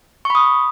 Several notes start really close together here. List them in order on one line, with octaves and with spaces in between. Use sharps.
C#6 B5 D#6